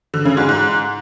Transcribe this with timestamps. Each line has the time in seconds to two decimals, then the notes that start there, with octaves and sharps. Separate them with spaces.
0.14 D3
0.25 C#3
0.37 G#2
0.49 G#2